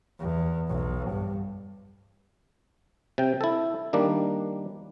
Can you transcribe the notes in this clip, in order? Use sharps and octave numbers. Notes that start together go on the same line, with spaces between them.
E2
B1
G2
C3 G5
E4 A4
D#3 G3 A#3 D4